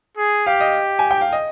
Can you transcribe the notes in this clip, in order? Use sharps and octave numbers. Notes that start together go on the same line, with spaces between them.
G#4
G4 F5
D#5
G#5
G5
F5
D#5